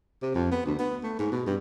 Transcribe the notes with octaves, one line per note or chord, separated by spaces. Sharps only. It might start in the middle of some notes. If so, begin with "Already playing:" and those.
C3
F2
B3
D2
B3
A3
G#2
B2
G2